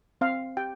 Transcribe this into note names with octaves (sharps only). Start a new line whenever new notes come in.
C4 F5
G4 G5